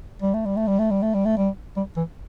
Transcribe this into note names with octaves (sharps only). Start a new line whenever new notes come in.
G3
A3
G3
A3
G3
A3
G3
A3
G3
A3
G3
G3
E3